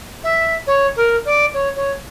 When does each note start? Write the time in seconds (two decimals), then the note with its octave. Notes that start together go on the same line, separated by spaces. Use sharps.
0.24 E5
0.67 C#5
0.96 A#4
1.25 D5
1.54 C#5
1.76 C#5